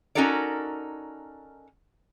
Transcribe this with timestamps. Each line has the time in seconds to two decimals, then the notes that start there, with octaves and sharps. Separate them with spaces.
0.15 C#4 D#4 F#4 A4 A#4 D5